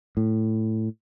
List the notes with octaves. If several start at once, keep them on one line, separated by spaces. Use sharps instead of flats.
A2